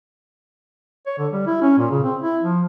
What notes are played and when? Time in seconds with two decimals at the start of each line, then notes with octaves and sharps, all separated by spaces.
1.07 C#5
1.18 D3
1.33 G3
1.47 E4
1.62 C#4
1.78 A#2
1.91 C#3
2.03 C4
2.21 E4
2.42 F3